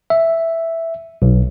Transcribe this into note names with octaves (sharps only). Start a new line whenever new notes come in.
E5
B1